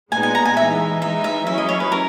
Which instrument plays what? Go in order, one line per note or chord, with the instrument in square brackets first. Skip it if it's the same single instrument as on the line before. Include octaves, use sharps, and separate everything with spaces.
[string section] A#2 G#3 B3 D#4 [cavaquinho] G#5
[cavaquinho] G#5
A#5
G#5
[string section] E3 G#3 D#4 [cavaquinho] E5
[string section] E3 G#3 D#4 [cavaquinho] E5
[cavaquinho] E5
[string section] F#3 C#4 E4 [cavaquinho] E5
[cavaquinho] D#5
C#5
B4
A#4